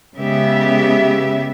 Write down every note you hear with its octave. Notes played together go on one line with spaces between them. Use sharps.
C#3 G#3 B3 G4 E5